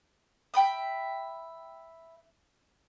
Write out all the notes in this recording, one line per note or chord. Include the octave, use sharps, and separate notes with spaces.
E5 G5 B5 D#6